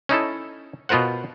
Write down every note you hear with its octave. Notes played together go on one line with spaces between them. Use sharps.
C#4 D#4 E4 A4
B2 B3 F4 A#4 C5 F#5